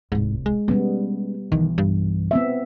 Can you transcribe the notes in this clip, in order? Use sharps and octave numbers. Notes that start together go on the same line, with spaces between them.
D1 C2 G#2
G#3
G3 B3 C#4
B1 D#3 E3
G2
B3 C4 E5